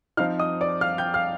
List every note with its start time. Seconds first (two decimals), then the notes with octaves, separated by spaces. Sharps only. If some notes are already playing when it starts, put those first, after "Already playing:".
0.17 F3 C4 D#4 F5 F6
0.39 D#5 D#6
0.61 D5 D6
0.81 F5 F6
0.98 G5 G6
1.14 F5 F6